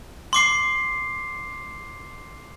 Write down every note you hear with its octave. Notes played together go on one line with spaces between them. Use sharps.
C6 D6 C7